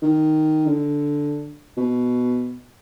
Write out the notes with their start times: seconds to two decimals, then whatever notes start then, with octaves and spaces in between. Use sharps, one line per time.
0.02 D#3
0.66 D3
1.77 B2